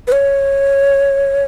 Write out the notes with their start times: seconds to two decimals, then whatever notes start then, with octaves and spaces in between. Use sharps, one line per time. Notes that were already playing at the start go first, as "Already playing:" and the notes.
0.07 B4
0.12 C#5